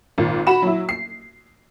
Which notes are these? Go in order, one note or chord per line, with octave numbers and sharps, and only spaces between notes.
G#1 A#2
F#4 B5 E7
F#3 E4
C7